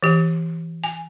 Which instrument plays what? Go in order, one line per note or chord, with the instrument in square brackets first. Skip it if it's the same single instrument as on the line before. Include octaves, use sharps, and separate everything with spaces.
[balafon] E3 G4
G#5